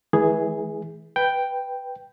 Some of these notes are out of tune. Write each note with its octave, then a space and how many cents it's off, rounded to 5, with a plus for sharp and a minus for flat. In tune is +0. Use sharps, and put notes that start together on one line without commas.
E3 -25 G#3 +45 G#4 +0
B4 +0 G5 +0